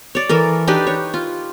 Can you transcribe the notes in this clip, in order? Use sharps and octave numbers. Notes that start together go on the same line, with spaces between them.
C#5 D5
E3 A4 A#4
D4 D#4 G4 B4
C#5
F4